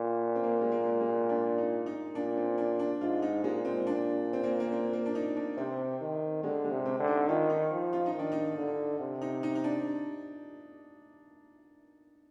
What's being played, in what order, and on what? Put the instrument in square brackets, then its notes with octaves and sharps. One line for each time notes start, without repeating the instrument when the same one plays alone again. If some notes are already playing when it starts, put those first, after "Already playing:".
Already playing: [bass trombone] A#2
[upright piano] C4
A#3
G#3
A#3
G#3
D4
D#4
D#4
[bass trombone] A#2 [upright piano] D4
[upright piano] C4
D4
D4
[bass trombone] G#2 [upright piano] F4
[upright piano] D#4
[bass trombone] A#2 [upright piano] G#3
[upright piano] C4
D4
C4
A#3
A#3
C4
A#3
D4
D#4
D4
[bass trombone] C3 [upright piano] C4
[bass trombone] D#3
[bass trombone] D3 [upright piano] G#3
[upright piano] G#3
[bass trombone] C3
[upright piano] C4
[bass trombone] D3
[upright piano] D#4
[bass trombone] D#3 [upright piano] F4
[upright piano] D#4
[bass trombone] F3
[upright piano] F4
D#4
[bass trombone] D#3
[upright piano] D4
D#4
[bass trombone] D3
C3
[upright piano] D#4
D#4
D#4
D4